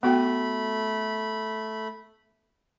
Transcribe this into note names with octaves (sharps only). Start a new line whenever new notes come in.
A3 B3 F#4 G5 B5